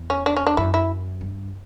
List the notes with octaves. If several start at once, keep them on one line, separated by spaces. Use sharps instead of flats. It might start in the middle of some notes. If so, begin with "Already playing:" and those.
Already playing: E2
C#4
D4
C#4
D4
F#2 E4
E4
G2